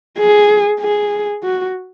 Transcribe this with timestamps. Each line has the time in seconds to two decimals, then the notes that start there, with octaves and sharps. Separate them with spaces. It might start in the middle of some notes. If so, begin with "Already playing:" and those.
0.18 G#4
0.80 G#4
1.43 F#4